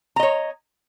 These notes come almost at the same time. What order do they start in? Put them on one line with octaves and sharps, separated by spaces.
A#5 D#5 C#5